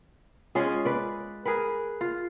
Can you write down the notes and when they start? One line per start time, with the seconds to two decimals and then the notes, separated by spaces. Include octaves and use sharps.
0.55 G#3 C#4 F4 G#4
0.85 B4 D5
1.45 G#4 A#4 B4
2.01 F4